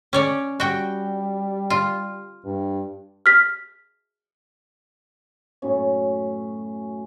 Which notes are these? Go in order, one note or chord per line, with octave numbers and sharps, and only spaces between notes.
C#4 C#5 D5
G3 F#4 G5
F4
G2
F6 B6
F#2 A2 C#4